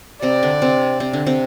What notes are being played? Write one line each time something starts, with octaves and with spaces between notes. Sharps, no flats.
C3 C4 D5
D3 D4
C3 C4
C3 C4
D3 D4
C3 C4